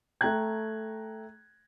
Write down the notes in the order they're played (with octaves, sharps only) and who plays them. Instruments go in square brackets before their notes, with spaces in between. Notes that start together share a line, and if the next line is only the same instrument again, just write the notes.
[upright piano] A3 G5 A#5 F#6 G#6